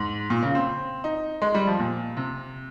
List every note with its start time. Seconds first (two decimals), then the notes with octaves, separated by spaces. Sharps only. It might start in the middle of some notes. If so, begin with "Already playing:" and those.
Already playing: G#2
0.30 A#2
0.43 C#3
0.55 C4
1.04 D#4
1.42 G#3
1.55 G3
1.67 F3
1.79 A#2
2.17 C3